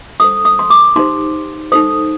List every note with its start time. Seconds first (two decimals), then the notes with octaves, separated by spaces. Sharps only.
0.20 D4 A4 C5 D#6
0.45 D#6
0.59 C6
0.70 D6
0.96 D#4 G4 C5 C6
1.72 D#4 A4 C5 D#6